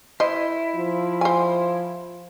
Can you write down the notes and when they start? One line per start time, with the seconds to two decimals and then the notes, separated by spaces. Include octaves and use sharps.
0.20 E4 C5 D#5
0.76 F3
1.21 C5 G#5